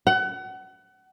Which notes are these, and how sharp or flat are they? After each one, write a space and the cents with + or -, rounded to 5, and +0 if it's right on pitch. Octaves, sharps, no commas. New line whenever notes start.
F#5 +30